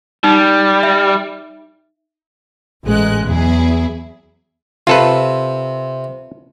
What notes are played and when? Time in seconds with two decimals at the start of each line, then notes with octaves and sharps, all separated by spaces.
0.24 G3 D#4
0.83 E5
2.86 A1 G#3 F#6
3.25 E2 F#3 E4 G#4
4.87 C3 F4 A4 B4